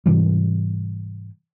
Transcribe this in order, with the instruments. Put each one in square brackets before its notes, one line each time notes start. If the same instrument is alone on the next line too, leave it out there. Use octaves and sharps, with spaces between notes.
[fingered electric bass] G#2 C3 E3 G3